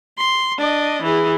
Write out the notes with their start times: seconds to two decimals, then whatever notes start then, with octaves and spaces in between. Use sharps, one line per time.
0.18 C6
0.58 D4 D#5
1.03 E3 G#4